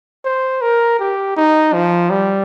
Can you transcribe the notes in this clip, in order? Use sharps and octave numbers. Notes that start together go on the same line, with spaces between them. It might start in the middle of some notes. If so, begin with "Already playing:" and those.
C5
A#4
G4
D#4
F3
G3